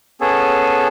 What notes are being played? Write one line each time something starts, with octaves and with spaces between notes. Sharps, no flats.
B3 C#4 G#4 A4